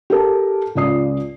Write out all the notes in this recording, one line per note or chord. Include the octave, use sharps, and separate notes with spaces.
G4 A4 A#4 A5
C#2 C#3 F4 D5 D#6 C7